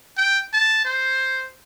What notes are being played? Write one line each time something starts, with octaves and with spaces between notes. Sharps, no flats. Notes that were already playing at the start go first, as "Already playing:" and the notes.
G5
A5
C5